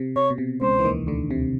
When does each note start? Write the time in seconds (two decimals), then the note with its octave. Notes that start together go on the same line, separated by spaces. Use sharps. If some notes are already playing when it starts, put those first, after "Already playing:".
Already playing: C3
0.16 C3 C#5
0.30 B2
0.38 C3
0.61 C#2 C#3 C5
0.79 E3
0.85 D#2 D#3
1.07 D2 D3
1.31 C3